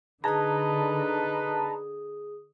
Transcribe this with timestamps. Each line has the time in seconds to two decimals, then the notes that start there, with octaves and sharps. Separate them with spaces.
0.24 D3 D#4 G#4 B4 A5 A#5 D#6